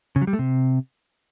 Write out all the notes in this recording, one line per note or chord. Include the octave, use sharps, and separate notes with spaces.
C#3
F#3
G3
A3
C3